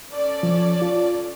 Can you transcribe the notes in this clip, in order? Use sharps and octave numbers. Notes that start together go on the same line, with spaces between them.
C#4 A4 D5
F3
F4